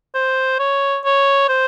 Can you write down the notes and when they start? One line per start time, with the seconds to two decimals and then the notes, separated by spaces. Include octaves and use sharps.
0.15 C5
0.59 C#5
1.05 C#5
1.49 C5